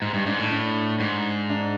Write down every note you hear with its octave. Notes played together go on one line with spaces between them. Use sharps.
G#2
G2
G#2 D4
A2
D4
G#2
D4